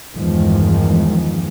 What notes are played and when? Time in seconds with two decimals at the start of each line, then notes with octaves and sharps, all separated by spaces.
0.15 E2 G2 D#3 F3 G#3